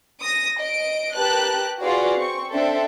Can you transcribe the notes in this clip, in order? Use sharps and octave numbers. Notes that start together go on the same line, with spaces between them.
D#6 A#6
D#5 D7
G4 A#4 B4 A5 F#6
F4 F#4 G#4 B4 D5 F5
C4 C#6
C4 D4 A4 E5